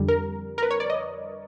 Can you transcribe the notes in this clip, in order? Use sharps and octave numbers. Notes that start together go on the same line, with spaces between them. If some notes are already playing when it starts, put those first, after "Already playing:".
Already playing: F2 D3 G3
A#4
A#4
B4
C#5
D5
D#5